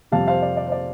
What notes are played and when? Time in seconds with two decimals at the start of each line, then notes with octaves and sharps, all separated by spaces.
0.12 F2 C3 G3 F5 A5
0.27 C5 F5
0.42 D5
0.57 D5
0.66 C5
0.72 D5